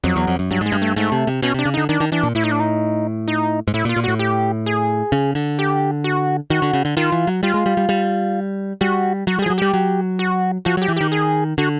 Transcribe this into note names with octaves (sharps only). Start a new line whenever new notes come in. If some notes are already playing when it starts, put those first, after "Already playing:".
F2 F#3
E2
F2
F#2
G2 F#3
G#2
G#3
G2
A3
G#2 A3
C3
C3
B2 C#4
C3 D4
C#3
D3 D#4
D#3 D4
D#3
E3 D4
A#2
A2 E4
D#4
D4
D#4
D#4
G#2
A2 E4
A#2
F4
A#2
A2 F#4
G4
G#4
C#3
D3
G4
F#4
D#3 F#4
D3
C#3
D3
D#3 F4
E3
F#3
G3 F4
G#3
G3
G3
G3
G3 F#4
F#3 F#4
G3
F3 G#4
F#3
G3 G4
F#3
F#4
F3 F#4
F#3 G4
E3
D#3 G4
G#4
D3 F#4